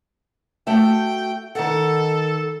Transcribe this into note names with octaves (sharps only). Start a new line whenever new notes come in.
A3 F#4 E5 G5
D#3 A4 F#5